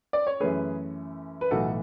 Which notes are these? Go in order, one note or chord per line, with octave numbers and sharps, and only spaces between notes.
D5
C#5
F#2 E3 A3 C#4 G#4 B4
B4
B1 A2 E3 F#4 A4